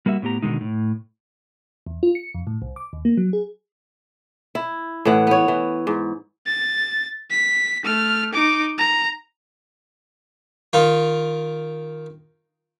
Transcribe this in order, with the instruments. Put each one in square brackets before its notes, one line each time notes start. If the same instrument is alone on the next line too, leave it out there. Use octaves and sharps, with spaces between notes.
[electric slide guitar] G3 A#3 F#4 E5
A2 B3 G4 A#5
B2 D3 D#3 G#3 D#4
A2
[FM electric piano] E2
F4
C#7
F2
A2
C2
D6
D#2
A#3
F#3
G#4
[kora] E4
A2 E3 F#5
B3 C#5
E3
G#2
[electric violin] A6
B6
A3 F6
D#4 D6
A#5
[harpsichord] D#3 F4